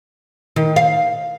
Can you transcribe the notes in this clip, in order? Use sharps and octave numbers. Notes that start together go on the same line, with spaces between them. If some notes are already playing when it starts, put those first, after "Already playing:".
D#3
F5